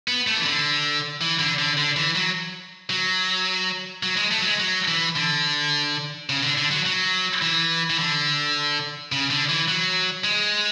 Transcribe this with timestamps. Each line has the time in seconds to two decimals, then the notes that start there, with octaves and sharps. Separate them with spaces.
0.08 B3
0.27 A3
0.37 E3
0.45 D3
1.21 E3
1.39 D3
1.59 D3
1.77 D3
1.96 E3
2.15 F#3
2.90 F#3
4.03 F#3
4.17 G#3
4.31 A3
4.39 F#3
4.46 G#3
4.60 F#3
4.88 E3
5.16 D3
6.29 C#3
6.43 D3
6.58 D3
6.71 F#3
6.86 F#3
7.42 E3
7.90 E3
7.99 D3
9.12 C#3
9.30 D3
9.49 E3
9.68 F#3
10.24 G#3